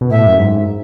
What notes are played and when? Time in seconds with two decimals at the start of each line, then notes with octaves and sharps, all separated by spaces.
0.01 B2
0.10 A2 E5
0.26 F#2
0.39 G#2